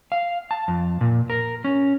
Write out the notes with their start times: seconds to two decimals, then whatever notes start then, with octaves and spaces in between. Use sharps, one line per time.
0.12 F5
0.51 A5
0.68 F2
1.01 A#2
1.30 A#4
1.64 C#4